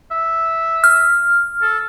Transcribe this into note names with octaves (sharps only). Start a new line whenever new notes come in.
E5
F6
A4